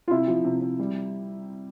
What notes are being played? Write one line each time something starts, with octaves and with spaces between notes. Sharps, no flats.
F4
C3 E4
F3
C3
C3
G3